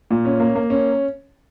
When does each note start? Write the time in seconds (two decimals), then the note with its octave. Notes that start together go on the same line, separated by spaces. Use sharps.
0.11 A#2
0.25 C#4
0.40 A#3
0.55 A#3
0.70 C#4